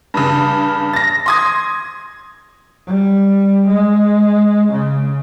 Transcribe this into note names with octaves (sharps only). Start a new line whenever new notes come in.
G2 C#3
A6 A#6
C6 D#6 G#6
G3
G#3
C#3